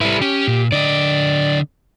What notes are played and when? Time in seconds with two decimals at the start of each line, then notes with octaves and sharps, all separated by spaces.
0.01 G3 E4 A4 B4
0.22 C#4 G4
0.48 A#2
0.72 D3 D5 D#5